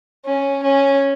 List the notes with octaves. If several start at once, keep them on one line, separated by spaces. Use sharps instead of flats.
C#4
C#4